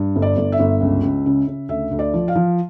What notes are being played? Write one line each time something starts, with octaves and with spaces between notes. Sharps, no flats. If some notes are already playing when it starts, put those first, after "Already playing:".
Already playing: G2
G1
D5
G1
E5
G1
C#2
C#2
C#3
C#3
D2 E5
D2
D5
F3
F5
F3